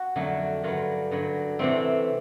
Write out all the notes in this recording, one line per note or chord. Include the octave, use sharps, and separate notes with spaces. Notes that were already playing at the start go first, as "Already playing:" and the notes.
Already playing: F#4
F2 D3 F#3 A3
G2 D3 F#3 F4
G2 D3 F#3
C3 E3 A3 C4